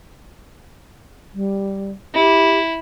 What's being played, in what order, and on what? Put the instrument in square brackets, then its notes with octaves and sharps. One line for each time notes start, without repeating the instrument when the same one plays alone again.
[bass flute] G3
[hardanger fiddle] E4 [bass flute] G4